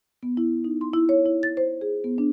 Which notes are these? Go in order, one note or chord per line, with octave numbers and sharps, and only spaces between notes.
B3
E4
D#4
C6
E4
C#5
E4
A6
C5
G#4
B3
D4